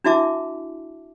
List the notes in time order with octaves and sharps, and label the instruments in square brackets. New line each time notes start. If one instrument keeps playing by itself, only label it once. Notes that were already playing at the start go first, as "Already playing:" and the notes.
[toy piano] D4 E4 F#4 E5 A5 D6